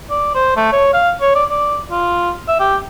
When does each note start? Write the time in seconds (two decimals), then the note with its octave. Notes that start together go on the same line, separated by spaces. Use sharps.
0.10 D5
0.35 C5
0.57 A3
0.72 C#5
0.94 F5
1.21 C#5
1.35 D5
1.51 D5
1.91 F4
2.48 E5
2.59 G4